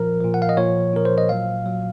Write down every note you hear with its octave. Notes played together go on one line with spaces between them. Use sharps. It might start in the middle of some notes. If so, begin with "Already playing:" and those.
Already playing: A#2 F3 A#4
A#2 F3
F#5
F5
D#5
A#2 F3 C#5
A#2 F3 A#4
C5
D#5
A#2 F#3 F5
A#2 F#3